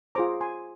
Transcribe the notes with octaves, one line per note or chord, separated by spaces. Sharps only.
F4 G#4 C5 A#5 D6
G#5 C6